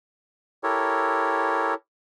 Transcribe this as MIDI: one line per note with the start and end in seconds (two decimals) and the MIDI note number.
0.63 1.74 64
0.63 1.74 67
0.63 1.74 69
0.63 1.74 70
0.63 1.74 73